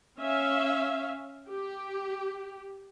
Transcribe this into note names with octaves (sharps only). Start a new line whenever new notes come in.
C#4 E5 F5
G4